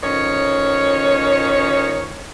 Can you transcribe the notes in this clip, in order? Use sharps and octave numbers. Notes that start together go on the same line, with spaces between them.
A2 D#3 F3 C#4 C#5